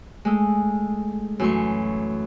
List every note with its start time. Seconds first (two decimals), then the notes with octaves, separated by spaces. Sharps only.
0.25 G#3 A3
1.39 F#2 E3 A3 C6 C#6